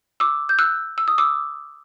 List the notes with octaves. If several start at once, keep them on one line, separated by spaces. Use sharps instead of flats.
D6 E6
G6
E6 F#6
E6
D#6
D6 E6